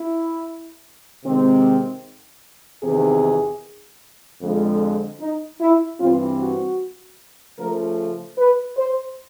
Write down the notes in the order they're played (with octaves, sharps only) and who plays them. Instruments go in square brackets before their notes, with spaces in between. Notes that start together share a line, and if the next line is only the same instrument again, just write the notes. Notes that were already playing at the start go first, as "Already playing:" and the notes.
Already playing: [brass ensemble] E4
C3 D#3 G#3 C4
E2 C3 D#3 G#4
F2 D3 F3 G#3
D#4
E4
G2 E3 G3 C4 F4
F#4
C#3 F3 A3 A#4
B4
C5